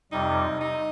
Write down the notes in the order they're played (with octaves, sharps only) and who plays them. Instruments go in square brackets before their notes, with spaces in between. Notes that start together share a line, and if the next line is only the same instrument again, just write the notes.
[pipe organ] F2 C3 G3 [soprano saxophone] D#4
[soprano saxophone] D#4